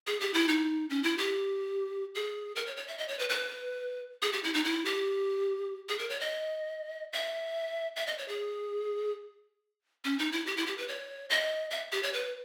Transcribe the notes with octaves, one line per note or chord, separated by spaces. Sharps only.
G#4
G4
E4
D#4
C#4
E4
G4
G#4
A#4
C#5
C#5
E5
D#5
C#5
B4
B4
G#4
G4
E4
D#4
E4
G4
G#4
A#4
C#5
D#5
E5
E5
D#5
C#5
G#4
C#4
D#4
E4
G4
E4
G4
B4
C#5
D#5
E5
G4
C#5
B4